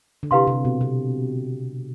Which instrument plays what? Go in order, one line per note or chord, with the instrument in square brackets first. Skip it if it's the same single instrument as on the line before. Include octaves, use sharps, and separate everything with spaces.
[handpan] D3
[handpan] C3 [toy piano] E4 G4 B4 F5 C6
[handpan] C3
B2
C3